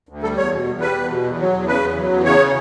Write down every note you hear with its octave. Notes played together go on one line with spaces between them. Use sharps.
D2
G3 A4
E2 C#5
B2
E2
G3 B4
E2
B2
E2
F#3
E2
C#3 B4
E2
F#3
E2
C#3 C#5